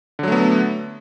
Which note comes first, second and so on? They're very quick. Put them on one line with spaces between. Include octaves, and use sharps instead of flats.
D3 F#3 A3 B3